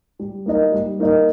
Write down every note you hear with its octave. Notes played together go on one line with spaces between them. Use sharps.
G3
A#3 D#4 A#4 D#5
G3
A#3 D#4 A#4 D#5